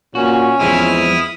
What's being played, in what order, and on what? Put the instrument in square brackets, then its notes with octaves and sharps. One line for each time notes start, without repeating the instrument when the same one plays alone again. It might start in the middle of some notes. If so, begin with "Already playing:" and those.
[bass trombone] A#2 [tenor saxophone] C#4 [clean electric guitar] F#4
[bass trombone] E2 [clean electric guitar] F3 G#3 C4 [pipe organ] E4 D#6 F6